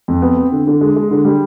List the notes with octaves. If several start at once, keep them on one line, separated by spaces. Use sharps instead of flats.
F2
B3
C4
D3
D3
G#3
G#3
D3
G3